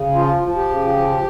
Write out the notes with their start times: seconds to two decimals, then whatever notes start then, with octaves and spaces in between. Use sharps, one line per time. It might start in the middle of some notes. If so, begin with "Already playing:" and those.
Already playing: C#3
0.15 F3 F4
0.43 F3
0.56 G4
0.70 C#3
0.96 F3